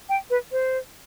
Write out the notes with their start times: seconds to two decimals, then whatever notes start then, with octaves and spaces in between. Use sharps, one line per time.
0.09 G5
0.30 B4
0.52 C5